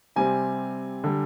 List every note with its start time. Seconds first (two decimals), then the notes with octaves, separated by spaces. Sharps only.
0.16 C3 G3 C4 G#5
1.04 D3 G3